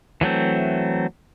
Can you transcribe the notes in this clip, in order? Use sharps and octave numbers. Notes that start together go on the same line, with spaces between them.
E3 F#3 A3 C4